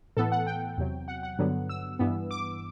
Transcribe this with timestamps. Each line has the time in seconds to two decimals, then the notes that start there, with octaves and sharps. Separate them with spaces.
0.17 A2 E3 B3 A4
0.32 F#5
0.47 G5
0.77 E2 C3 F#3
1.08 F#5
1.23 F#5
1.39 G2 D3 F#3 B3
1.69 E6
1.99 G2 E3 B3
2.31 D6